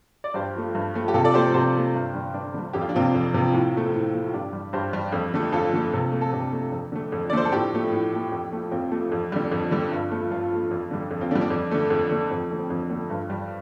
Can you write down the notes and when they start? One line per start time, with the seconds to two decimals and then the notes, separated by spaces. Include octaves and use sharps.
0.24 D5
0.34 G2 G4 C5
0.54 F3 A3
0.75 G2
0.94 F3 A3
1.08 G4
1.14 C3 F4 A4
1.24 A4 D5
1.34 F3 A3 G4 C5
1.54 C3 G4 C5
1.75 F3 A3
1.95 G2
2.14 D3 G3
2.34 G2 D4
2.54 D3 G3
2.73 F2 G4
2.81 F4
2.89 D4
2.94 C3 F3 C4 F4
3.14 F2
3.34 C3 F3
3.53 A2
3.73 F3 A3
3.94 A2
4.13 F3 A3
4.28 F4
4.33 G2 D4 G4
4.53 G3
4.73 G2 G4 C5
4.93 G3
5.13 F2
5.34 D3 A3
5.53 F2 F4 A4
5.73 D3 A3
5.93 C3
6.12 A3
6.21 A4
6.33 C3 D4 G4
6.53 A3
6.72 F2
6.92 D3 A3
7.12 F2
7.30 D5
7.33 D3 A3 C5
7.45 A4
7.52 A2 D4 G4
7.73 F3 A3
7.92 A2
8.12 F3 A3
8.32 F2
8.53 F3 A3
8.71 F2 C4 F4
8.92 F3 A3
9.12 F2
9.32 D3 G3
9.52 F2
9.71 D3 G3
9.91 G2
10.11 F3 A3
10.31 G2 F4 A4
10.51 F3 A3
10.71 F2
10.91 D3 G3
11.11 F2
11.21 C4 F4
11.31 D3 G3 D4
11.41 D4
11.50 F2
11.71 D3 A3
11.90 F2
12.11 D3 A3
12.31 F2 C4
12.51 D3 A3
12.58 C4
12.70 F2
12.90 D3 A3
13.10 G2
13.30 G3